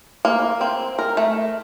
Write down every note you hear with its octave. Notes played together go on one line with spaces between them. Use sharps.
A#3
C4
A#4
A3